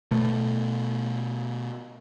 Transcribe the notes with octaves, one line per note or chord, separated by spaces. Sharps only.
B2 A3